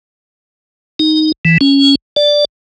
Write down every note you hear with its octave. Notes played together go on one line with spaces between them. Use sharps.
D#4
E3
C#4
D5